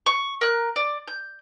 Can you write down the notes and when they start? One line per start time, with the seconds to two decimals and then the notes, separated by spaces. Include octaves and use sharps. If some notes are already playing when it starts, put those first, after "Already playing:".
0.06 C#6
0.41 A#4 F#6
0.76 D5
1.08 G6